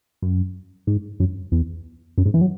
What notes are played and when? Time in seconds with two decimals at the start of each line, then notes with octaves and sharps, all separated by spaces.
0.22 F#2
0.87 G#2
1.20 F#2
1.52 E2
2.18 F#2
2.26 G#2
2.34 E3
2.41 F#3